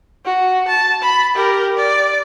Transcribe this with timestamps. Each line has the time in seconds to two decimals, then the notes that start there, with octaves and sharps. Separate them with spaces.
0.25 F#4
0.68 A5
1.02 B5
1.35 G4 A#4
1.76 D5